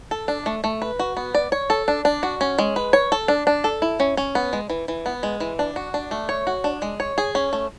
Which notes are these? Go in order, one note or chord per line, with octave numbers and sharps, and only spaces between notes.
A4
D4
A3
A3
B4
F#4
B3
D5
C#5
A4
D4
D4
F#4
C#4
G#3
B4
C#5
A4
D4
D4
A4
E4
C#4
C#4
B3
G#3
E3
E3
B3
G#3
E3
D4
F#4
D4
A3
C#5
F#4
D4
G#3
C#5
G#4
C#4
A3